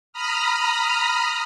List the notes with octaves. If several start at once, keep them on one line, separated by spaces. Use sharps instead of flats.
A#5 B5 D#6 F6